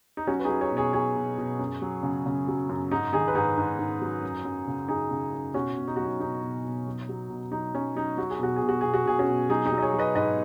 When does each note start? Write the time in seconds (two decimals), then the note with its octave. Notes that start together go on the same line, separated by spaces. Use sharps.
0.17 D#4
0.27 F#3 C#4 F#4
0.39 B4
0.45 F#3 D#4 G#4
0.61 G#4 C#5
0.72 B2
0.77 G#4 C#5
0.93 F#3 G#4 C#5
1.16 B2
1.38 B2
1.59 F#2
1.82 F#3
2.03 C#3
2.26 C#3
2.48 F#3
2.69 F#2
2.91 G#2 D#4
3.13 D#3 D#4 G#4
3.28 B4
3.35 G#2 D#4 G#4
3.58 G#2
3.79 G#2
4.01 F#3
4.22 F#2
4.45 F#2
4.67 C#3
4.88 F#2 D#4 G#4
5.11 C#3
5.33 F#2
5.54 B2 C#4 F#4
5.77 B2
5.88 D#4
5.96 F#3 F#4
6.05 D#4
6.20 B2 D#4
6.43 B2
6.64 B2
6.87 F#3
7.09 F#3
7.30 B2
7.52 F#3 D#4
7.74 F#3 C#4
7.96 F#3 D#4
8.17 F#3 F#4
8.30 G#4
8.39 B2 F#4
8.56 G#4
8.62 B2
8.69 F#4
8.81 B2 G#4
8.94 F#4
9.06 B2 G#4
9.19 C#4 F#4
9.28 B2
9.49 F#3 D#4 G#4
9.66 D#4 G#4
9.72 F#3
9.78 D#5
9.82 G#4 C#5
9.93 F#3
9.99 B4 D#5
10.15 G#2 B4 D#5